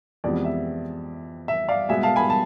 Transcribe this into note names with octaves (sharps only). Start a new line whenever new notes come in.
F2 C3 E3 G#3 B3 D5
E5
E5
D5 F5
B2 G#3 B3 E5 G#5
F5 A5
G#5 B5
A5